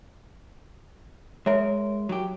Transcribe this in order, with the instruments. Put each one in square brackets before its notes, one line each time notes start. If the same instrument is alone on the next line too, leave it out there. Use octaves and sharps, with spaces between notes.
[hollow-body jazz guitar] G#3 A#4 [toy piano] C#5 E5
[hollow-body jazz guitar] F#3 G4